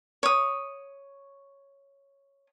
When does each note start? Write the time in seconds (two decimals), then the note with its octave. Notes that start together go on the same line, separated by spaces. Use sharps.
0.23 C#5 D#6